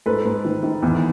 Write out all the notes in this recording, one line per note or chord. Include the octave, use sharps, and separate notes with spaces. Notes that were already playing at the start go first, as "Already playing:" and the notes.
G#2 A4 B4
G#2
D#3
D#3
E2